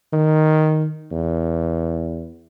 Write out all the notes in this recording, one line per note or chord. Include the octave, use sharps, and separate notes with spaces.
D#3
E2